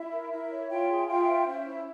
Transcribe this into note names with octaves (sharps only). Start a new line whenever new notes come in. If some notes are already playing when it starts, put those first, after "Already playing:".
Already playing: E4 E5
A#4
E4 E5
C#5
F4 E5 G5
G#4
F4 E5 G5
C5
C#4 E5
E4